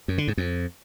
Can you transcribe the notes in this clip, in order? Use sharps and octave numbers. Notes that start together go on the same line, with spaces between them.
F#2
D3
G#2
F2